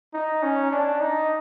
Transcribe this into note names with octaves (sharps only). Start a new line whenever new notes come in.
D#4
C#4
D4
D#4